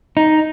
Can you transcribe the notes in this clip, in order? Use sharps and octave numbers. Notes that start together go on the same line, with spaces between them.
D#4